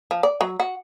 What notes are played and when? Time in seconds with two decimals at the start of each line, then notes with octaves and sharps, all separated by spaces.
0.11 F3
0.23 D5
0.41 F#3
0.60 F#4